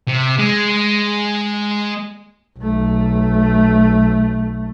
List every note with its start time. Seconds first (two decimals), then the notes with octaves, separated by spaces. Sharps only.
0.08 C3
0.38 G#3
2.59 B1 A3